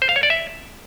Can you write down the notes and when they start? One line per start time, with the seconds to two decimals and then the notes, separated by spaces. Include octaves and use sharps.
0.02 C5
0.09 F5
0.16 C#5
0.23 D5
0.30 E5